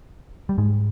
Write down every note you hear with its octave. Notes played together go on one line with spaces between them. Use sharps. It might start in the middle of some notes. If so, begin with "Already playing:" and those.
G3
G#2 G#3